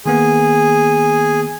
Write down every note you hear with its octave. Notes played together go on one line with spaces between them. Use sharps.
D#3 A#3 B3 G#4